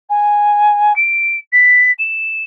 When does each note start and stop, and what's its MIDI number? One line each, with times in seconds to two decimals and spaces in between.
0.09 0.95 80
0.96 1.36 98
1.52 1.91 95
1.99 2.43 100